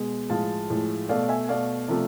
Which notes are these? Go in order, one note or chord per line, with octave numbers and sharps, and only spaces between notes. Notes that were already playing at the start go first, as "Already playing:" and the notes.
Already playing: B2 G#3
A2 F3 G#3 F5 A5
A2 F3 G#3
B2 A3 D5 F5
E5 G#5
B2 A3 D5 F5
C3 F3 A3